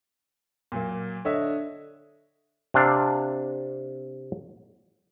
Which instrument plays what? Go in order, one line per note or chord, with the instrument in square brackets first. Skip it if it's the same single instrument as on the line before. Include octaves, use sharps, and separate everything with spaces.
[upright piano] A#2 F#3 A#3
[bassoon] D3 [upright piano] C#5 D#5 E5
[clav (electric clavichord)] C3 D4 F5